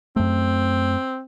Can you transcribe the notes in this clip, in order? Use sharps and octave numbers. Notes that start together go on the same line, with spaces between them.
F#2 A3 C4